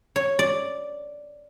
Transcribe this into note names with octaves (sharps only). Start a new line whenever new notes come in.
C#5
D5